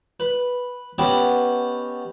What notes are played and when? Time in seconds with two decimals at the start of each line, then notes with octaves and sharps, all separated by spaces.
0.20 B4
0.98 B3 C#4 G4 B4 D#5 A5